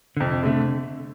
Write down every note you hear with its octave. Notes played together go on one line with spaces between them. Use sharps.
D3
F2 C3
D3 A3